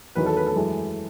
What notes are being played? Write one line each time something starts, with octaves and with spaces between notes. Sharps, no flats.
E2 D#3 F#3 B4
A4
B4
A4
F#2 E3 G#3